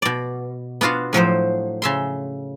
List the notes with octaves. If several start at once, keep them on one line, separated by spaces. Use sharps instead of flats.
B2 D5
B3 D4 F4 F#4 F5
A2 F3 F#3 C5
C#3 E5 C6